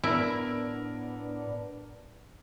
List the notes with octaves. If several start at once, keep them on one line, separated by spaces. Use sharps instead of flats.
A2 B3 D4 E4 A#4 E6 D7